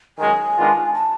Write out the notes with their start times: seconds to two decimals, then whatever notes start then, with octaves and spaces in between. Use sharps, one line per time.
0.18 F#2 D#3 G#3 G#5
0.57 D#3 G#3 B3 D4 F4
0.94 A5